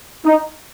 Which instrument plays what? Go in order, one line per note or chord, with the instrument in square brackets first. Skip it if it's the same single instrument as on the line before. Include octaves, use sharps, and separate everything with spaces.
[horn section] D#4